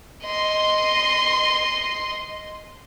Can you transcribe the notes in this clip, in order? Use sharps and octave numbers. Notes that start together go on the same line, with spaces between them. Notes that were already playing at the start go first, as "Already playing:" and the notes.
D#5 C6